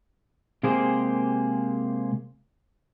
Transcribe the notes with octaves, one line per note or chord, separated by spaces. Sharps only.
C3 G#3 A#3 G4 G#4 C5